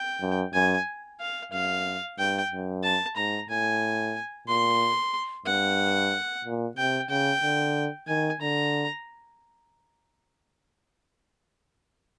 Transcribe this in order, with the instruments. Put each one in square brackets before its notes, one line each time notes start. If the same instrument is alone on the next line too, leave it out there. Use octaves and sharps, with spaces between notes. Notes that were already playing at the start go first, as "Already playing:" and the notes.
Already playing: [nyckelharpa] G5
[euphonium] F#2
[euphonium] F#2 [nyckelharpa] G#5
[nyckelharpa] F5
[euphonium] F#2 [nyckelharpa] F5
[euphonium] G2 [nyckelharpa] G5
[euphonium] F#2
[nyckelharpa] A5
[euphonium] G#2 [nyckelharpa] A#5
[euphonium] A2 [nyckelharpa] G#5
[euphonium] A#2 [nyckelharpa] C6
[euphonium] G2 [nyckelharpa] F#5
[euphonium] A#2
[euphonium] C3 [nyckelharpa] G5
[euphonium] C#3 [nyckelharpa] G5
[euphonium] D3
[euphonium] D#3 [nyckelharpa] G#5
[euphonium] D3 [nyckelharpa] A#5